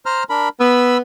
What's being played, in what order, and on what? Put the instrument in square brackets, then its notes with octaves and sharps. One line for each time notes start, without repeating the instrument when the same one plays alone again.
[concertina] C5 A#5 F6
D4 A#4 B5
[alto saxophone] B3 [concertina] B5 E6